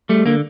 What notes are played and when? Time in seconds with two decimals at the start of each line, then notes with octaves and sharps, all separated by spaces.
0.09 G3 A3
0.26 D3 A#3